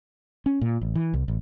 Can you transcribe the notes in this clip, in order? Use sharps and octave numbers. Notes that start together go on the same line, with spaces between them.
C#4
A#2
A1
E3
C2
A1